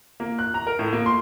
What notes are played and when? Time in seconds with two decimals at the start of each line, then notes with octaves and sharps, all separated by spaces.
0.20 A#3
0.39 F#6
0.54 A#5
0.67 A#4
0.79 A2
0.93 A#3
1.06 C6